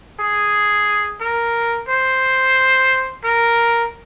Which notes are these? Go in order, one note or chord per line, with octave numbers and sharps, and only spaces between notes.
G#4
A#4
C5
A#4